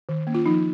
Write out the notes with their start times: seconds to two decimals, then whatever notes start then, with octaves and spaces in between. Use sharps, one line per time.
0.09 D#3
0.27 A#3 C#4
0.34 F4
0.46 F3 D#4